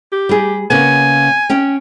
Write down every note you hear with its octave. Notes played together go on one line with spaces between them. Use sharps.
G4
G3 G#4
C#3 A#3 B3 G#5
C#4 G5